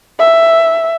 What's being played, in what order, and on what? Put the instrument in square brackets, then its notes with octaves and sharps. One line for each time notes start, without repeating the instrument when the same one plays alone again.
[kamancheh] E5